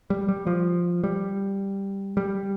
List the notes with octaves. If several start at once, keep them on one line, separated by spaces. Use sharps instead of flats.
G3
G3
F3
G3
G3